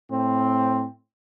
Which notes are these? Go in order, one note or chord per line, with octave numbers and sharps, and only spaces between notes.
A2 C4